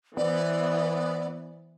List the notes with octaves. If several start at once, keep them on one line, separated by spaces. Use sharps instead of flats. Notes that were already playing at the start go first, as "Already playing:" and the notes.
E3 B3 C5 D5